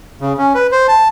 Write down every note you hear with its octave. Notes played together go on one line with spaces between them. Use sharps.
C#3
C#4
B4
C5
A5